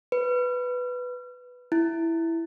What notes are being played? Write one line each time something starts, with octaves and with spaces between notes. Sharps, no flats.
B4
E4